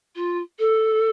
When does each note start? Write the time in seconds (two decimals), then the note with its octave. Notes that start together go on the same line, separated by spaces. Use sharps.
0.16 F4
0.59 A4